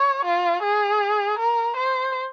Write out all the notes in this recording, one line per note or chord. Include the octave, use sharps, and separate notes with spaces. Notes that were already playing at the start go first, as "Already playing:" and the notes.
Already playing: C#5
F4
G#4
A#4
C5